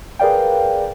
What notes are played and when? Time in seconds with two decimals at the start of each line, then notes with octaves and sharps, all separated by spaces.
0.19 G#4 A#4 B4 D5 F5 G5